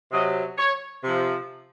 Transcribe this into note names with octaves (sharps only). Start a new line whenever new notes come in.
C3 F#3 D#5
C#5
C3 F3